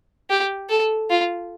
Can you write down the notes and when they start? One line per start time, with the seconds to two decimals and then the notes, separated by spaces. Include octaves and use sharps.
0.30 G4
0.69 A4
1.10 F4